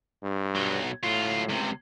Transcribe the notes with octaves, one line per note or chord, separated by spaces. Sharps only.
G2
B1 F#3
A2 F#3 F4
C#2 C3